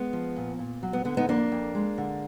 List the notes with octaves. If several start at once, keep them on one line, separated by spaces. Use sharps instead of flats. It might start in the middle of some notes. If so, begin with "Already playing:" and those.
Already playing: G#3 B3
F3
A#2
A#2
F#3
B3
D3 B3
B3 D#4
F2 A#3 D4
F2
G#3
D3